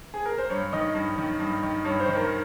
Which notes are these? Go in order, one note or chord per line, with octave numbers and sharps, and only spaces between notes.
G#4
A#4
C5
G2 C#5
D#3 D#5
G2
D#3
G2
D#3
G2 C#5
C5
D#3
A#4